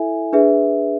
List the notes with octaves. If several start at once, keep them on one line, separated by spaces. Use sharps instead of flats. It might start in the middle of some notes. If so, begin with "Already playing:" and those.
Already playing: E4 A4 E5 G#5
D4 G#4 B4 E5